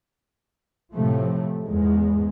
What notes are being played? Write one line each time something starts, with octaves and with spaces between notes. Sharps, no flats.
A2 C3 F3 A3
E2 G#2 G#3